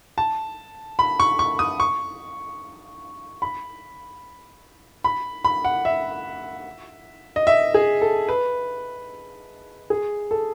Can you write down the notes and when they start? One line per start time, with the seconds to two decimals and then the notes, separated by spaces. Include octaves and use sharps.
0.18 A5
0.99 B5
1.20 C#6
1.39 C#6
1.59 D#6
1.80 C#6
3.42 B5
5.04 B5
5.45 B5
5.65 F#5
5.85 E5
7.36 D#5
7.47 E5
7.74 G#4
8.02 A4
8.29 B4
9.90 G#4
10.31 A4